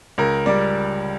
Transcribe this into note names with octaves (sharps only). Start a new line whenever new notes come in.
C#2 A#4
G3 D5